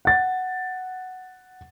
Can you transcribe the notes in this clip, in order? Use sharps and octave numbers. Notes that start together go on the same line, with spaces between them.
F#5 A6